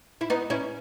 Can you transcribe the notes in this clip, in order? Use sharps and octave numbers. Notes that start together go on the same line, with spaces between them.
E4
B3 D#4
C#4 E4